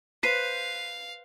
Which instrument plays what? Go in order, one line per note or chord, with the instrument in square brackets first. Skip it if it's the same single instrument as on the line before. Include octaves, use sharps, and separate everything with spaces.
[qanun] B4 C5 [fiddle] F5 [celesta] B6 C7 D#7